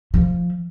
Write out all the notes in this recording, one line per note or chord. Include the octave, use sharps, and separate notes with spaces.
F3